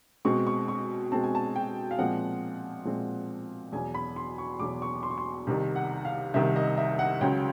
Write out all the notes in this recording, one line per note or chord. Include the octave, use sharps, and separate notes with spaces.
B2 G#3 C4 C#6
C#6
C#6
B2 G#3 C4 A5
G#5
A5
G5
F5
A#2 F3 G#3 C4 F#5
A#2 F3 G#3 C4
E2 B2 F#3 G#5
B5
C6
C#6
E2 B2 F#3 D6
C#6
C6
C#6
C6
C2 C3 D#3
F#5
F5
C2 C3 D#3 E5
D#5
E5
F#5
C#2 C#3 F#3 G5